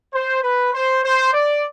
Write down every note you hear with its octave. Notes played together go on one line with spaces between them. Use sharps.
C5
B4
C5
C5
D5